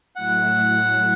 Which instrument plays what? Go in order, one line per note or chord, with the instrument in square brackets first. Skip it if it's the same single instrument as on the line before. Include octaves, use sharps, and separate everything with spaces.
[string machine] A2 F#3 A3 E4 [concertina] F#5